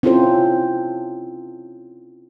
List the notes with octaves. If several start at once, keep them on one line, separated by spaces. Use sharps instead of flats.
C4 C#4 E4 F4 A4 C5